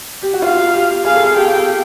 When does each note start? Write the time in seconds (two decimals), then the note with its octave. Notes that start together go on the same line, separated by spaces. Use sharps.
0.23 G4
0.33 F#4
0.42 F4 F5
0.74 G4
1.05 G#4 F5
1.15 A4
1.25 G#4
1.36 G4 G5